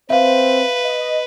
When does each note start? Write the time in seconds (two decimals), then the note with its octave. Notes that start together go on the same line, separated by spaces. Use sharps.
0.10 C4 B4 C5 E5 F5
0.84 D#5